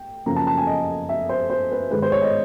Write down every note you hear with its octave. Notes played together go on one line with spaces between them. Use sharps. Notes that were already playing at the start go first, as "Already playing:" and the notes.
Already playing: G5
F#2 C#3 F3 A#3 A#5
A5
A5
G#5
D#5
E5
C5
C5
B4
G#2 D#3 G#3 B4
C5
C#5
D#5